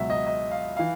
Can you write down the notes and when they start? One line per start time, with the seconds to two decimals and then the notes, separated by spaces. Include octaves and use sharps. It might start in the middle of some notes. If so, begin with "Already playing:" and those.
Already playing: C#2 B2 F#3 E5
0.10 D#5
0.27 D#5
0.51 F5
0.77 E3 F5